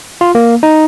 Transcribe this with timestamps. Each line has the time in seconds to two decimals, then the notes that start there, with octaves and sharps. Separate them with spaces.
0.21 F4
0.35 A#3
0.63 D#4